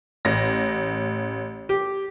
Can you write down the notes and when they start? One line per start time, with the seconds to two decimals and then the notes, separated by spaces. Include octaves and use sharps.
0.25 A1 A#6
1.69 G4